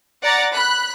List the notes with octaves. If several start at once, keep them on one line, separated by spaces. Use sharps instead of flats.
D5 F#5 A#5 A6
B5 F#6